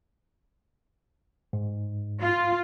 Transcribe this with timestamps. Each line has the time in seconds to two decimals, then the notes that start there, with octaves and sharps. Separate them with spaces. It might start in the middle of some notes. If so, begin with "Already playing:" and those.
1.53 G#2
2.21 F4